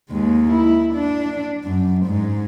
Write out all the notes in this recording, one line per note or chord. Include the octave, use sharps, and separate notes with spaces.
D#2 G#3
E4
D4
F#2
G#2